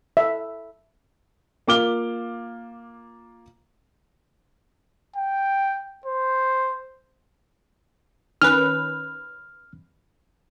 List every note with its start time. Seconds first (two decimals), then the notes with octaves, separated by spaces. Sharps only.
0.17 E5
1.67 A#3 F4 D6 F6 G7
5.16 G5
6.06 C5
8.42 D#3 C#4 B4 F6